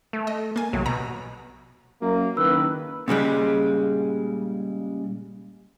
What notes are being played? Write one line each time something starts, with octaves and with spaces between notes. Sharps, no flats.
A3
D#5
A#3 G#5
B1 C3 E3 F#3
B2 A#5
F#2 F#3 A#3
F#1 D#3 B4 E6
A#2 C#3 G3 G#3